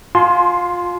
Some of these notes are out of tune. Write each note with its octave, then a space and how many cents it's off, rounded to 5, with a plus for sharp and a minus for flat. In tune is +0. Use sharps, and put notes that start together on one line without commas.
F4 +20 G#5 +45 C6 +0